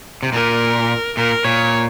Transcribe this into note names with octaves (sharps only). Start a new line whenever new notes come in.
C3
A#2 A#4
A#2 A#4
A#2 C#5